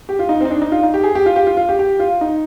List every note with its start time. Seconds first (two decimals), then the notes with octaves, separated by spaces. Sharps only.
0.09 G4
0.19 F4
0.29 D#4
0.41 C4 D#4
0.51 D4
0.62 D#4
0.72 F4
0.83 D#4
0.94 G4
1.04 G#4
1.15 G4
1.26 F4
1.36 G4
1.47 F4
1.57 F4
1.69 G4
1.79 G4
1.99 F4
2.21 D#4